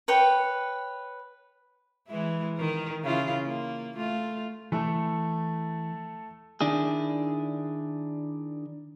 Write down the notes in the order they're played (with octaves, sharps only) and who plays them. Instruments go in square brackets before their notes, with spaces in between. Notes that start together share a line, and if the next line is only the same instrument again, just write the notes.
[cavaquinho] B4 C#5 G5
[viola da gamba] E3 G#3 E4
D#3 A#4
C#3 E4 F4
A#3
A3 F4
[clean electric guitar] E3 [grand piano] A3 A4
[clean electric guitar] D#3 D4 E4 G#4